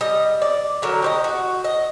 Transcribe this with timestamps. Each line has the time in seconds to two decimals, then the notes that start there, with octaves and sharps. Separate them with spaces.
0.01 G3 D#5
0.42 D5
0.82 D3 F#3 A#4
1.02 G4 C5 D#5
1.24 F#4
1.64 D#5